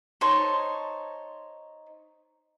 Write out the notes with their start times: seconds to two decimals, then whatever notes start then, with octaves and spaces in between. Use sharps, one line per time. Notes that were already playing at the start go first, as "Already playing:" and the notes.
0.21 D#4 C5 C#5 A5